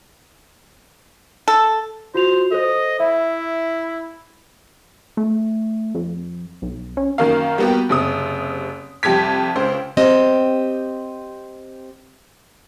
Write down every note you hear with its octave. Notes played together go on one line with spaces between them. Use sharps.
A4
F4 F#4 C5 F7
A4 C5 D#5
E4 E5
A3
F2
B1
C#4
F#2 D#3 A#3 F5
G3 A#3 B3 F#4 G4
F#1 C3 D#6
C2 F2 G4 G#6 B6
C#2 C5
C4 G4 D#5